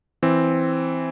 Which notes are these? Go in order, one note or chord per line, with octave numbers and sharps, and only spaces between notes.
E3 C4